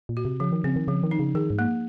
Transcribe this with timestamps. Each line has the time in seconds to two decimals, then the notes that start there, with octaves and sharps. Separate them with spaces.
0.09 A#2
0.17 F#4
0.25 C3
0.40 C#3 F3
0.52 D#3
0.64 C#3 C4
0.76 D#3
0.88 C#3 F3
1.03 D#3
1.11 D#4
1.19 C#3
1.35 D#3 G#4
1.50 G#2
1.59 A#3